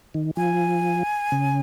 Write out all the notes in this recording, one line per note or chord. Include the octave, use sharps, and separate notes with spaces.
D#3
F3 G#5
C#3